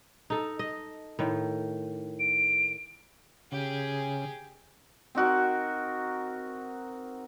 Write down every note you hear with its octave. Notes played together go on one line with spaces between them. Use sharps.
D#4 A4
D#5
A2 D#3
D7
C#3 G4 G#4
C4 D#4 F#4 A#4